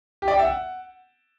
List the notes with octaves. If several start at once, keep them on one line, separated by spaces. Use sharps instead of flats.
G4
D5
G5
E5
F#5